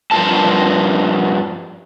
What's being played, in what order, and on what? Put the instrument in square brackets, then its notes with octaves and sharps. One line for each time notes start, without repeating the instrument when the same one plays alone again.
[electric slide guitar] G2 A#2 F3 A#4 A5